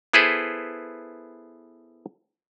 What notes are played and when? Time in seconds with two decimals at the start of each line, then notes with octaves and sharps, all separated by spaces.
0.14 B3 E4 G#4 A4 B4 C5